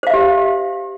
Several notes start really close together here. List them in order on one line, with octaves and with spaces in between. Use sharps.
C5 F5 E5 G4